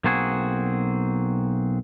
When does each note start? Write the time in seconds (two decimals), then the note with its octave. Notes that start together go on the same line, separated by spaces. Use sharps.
0.04 B1 A#3 C4 F#4 G#4